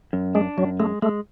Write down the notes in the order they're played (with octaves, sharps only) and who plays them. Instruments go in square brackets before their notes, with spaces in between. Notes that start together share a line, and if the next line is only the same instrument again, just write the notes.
[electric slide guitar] F#2
[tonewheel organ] G#3 [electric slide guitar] D4
[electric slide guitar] F#2 [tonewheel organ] F#3
[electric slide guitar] G#3 [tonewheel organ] A3
[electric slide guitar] G#3 [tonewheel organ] A3